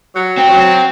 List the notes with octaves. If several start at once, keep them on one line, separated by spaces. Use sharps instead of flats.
F#3
C4
F#3
C4